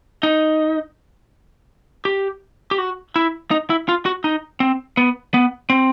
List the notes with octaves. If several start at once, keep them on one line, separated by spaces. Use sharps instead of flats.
D#4
G4
G4
F#4
E4
D#4
E4
F4
F#4
D#4
C4
B3
B3
C4